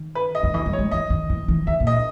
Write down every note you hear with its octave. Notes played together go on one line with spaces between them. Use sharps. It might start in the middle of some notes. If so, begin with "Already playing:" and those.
Already playing: D#3
B4
D#5
G3
E3 D#5
G3
C#5
G#3
E3 D#5
D#3
E3
E3
D#3 E5
A#2
D#5